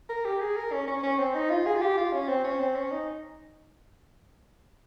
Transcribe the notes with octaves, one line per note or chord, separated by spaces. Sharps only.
A#4
G4
G#4
A#4
C#4
C#4
C#4
C4
D#4
F4
G#4
F4
G4
F4
C#4
C4
C#4
C4
C#4
D#4